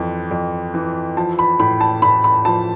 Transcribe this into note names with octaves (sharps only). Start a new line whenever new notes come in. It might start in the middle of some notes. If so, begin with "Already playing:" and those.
Already playing: F2 E3
F2
E3
F3 A5
B5
A2 B5
A5
A2 B5
B5
F3 A5